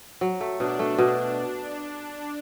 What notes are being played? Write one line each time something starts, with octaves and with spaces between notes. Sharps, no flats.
F#3
A3
B2 D4
A3
B2